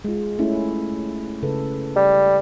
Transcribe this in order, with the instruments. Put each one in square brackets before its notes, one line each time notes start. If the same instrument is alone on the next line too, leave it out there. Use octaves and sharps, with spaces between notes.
[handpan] G#3 F4
A3 C#4 E4
C#3 A4 B4
[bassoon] G3